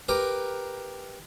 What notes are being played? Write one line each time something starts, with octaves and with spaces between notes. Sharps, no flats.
G4 A#4 B4